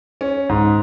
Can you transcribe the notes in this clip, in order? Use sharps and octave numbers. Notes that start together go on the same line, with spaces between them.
C#4
G#2